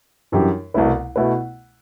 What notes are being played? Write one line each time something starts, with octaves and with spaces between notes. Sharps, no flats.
F#2 E3 G3 D4 G4
C2 B2 A3 E4 B4
B2 A3 E4 B4